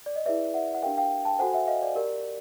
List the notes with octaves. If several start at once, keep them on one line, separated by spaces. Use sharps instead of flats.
D5
D#5
E4 G#4 B4 D5 E5
E5 F#5
F#5
D4 G4 A#4 F5 G5
F5 G5
G5 A5
F#4 A4 C5 F#5 G#5
E5 F#5
D#5 F5
D5
G4 A#4 D5